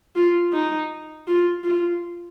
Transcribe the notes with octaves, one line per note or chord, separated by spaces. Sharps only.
F4
D#4
F4
F4